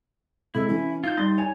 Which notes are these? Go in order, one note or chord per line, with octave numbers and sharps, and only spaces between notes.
C3 G#3 E4 A4
E3 C#4
D#4 F4 G6
G3 C6 A6
C#5 G#5